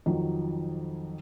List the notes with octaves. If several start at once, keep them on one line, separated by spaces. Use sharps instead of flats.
F2 D#3 F3 F#3